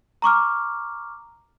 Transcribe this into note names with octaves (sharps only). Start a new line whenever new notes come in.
A#5 C#6 D6 F6